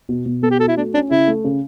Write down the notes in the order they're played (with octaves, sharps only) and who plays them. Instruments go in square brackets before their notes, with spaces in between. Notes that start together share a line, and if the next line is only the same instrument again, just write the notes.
[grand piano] B2
B2
[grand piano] B3 [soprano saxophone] A4
[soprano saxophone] G4
[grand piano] F#4 [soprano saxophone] A4
[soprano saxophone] E4
[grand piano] A3 [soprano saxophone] D4
[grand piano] C#4 [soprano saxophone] D4
[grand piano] C#3 [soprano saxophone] E4
[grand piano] A3
C#3